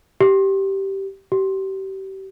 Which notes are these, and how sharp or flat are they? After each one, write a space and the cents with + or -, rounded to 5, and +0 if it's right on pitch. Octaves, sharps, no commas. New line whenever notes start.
G4 -15
G4 -35